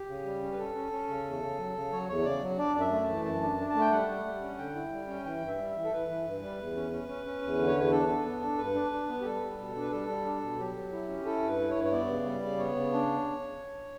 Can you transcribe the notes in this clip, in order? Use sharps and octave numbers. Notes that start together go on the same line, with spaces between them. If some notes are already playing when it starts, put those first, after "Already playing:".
Already playing: G4
C#3
G3
C#4
B4
C#4 A4
C#4
C#4
C#3
E2
C#3
F#3
C#3
F#3 C#5
E2 C#5
C#3 D5
F#3
D4 D5
F#2 D5
E5
A3
A5
E3
F#2 A5
D4
D4
A5
A3
G5
G3 F#5
G3
G3
C#4
D3 G5
E4
G3
C#4
E3 G5
G2
E5
G3
E5
E3
A4
E3 B4
E3
G2
G3
E2
C#4
C#4
C#4
C#4
E2
D3
C#5
E2 B4
D4 A4
D4
B3
D4
G2 B4
D4
D4
B3
G4
G3 A4
G3
B2
D4
B4
G3 A4
G3
D4
B2
F#3 G4
F#3
E4
C#4
E4 A4
G2 B4
E4
C#5
G2
C#5
B3 D5
C#3
G3
C#3
B3 C#5
C#3
D4